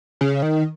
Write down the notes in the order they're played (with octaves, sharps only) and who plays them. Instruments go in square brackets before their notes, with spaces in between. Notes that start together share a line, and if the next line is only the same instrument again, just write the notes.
[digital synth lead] C#3
D#3